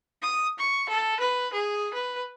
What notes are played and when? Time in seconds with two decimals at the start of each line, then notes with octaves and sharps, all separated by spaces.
0.22 D#6
0.58 C#6
0.89 A4
1.19 B4
1.53 G#4
1.93 B4